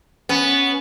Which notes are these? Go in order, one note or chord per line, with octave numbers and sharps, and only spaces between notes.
B3 C#4